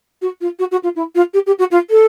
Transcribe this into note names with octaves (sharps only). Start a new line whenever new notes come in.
F#4
F4
F#4
F#4
F4
E4
F4
G4
G4
F#4
F4
A4